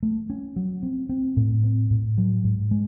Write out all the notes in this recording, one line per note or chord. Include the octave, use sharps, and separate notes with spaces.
A3
C#4
F#3
C4
C4
A2
C4
A2
F#3
G#2
G#3